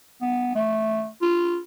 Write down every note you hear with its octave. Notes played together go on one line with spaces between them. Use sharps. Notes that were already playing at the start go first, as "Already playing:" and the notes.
B3
A3
F4